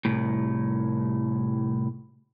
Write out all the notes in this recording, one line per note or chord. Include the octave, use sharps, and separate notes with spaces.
C2 A2